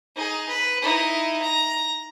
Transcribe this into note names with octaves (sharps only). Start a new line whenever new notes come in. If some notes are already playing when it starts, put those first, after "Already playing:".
D#4 G#4
B4
D#4 E4
A#5